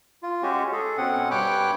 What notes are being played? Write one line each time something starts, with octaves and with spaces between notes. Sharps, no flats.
F4
G#3 C#4 F#4 G4
G#4 A4
B2 C4 C#4 F#5
G2 C#5 G5 B5 D6 F#6